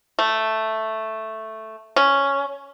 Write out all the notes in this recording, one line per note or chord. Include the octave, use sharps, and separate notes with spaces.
A3
C#4